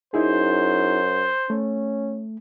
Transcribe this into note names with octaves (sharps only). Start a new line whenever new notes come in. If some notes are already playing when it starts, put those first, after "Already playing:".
F#2 D#4 E4 G#4 C5
A3 C#4